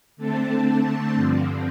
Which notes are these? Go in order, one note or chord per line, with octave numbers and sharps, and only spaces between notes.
D3 A3 C4 A5
G2 D3 F3 C4